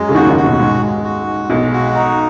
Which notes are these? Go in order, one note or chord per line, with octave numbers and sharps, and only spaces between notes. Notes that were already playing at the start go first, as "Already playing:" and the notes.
Already playing: F#2 F#3 G#3
C#3
D#2 D#3 F#4
F#3
D#2 D#3
F#4
B1 B2
G#2 G#3
G#3
F#4
G#3
B1 B2 G#3
F#4
D#4